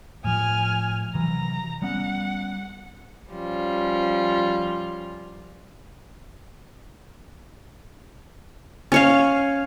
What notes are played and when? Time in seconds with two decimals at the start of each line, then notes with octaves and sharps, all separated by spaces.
0.24 A2 F3 G#5 F6
1.14 C3 E3 F#3 A#5
1.82 G3 B3 C#4 F#5
3.30 F3 G3 C#4 F4
8.92 C#4 C#5 F5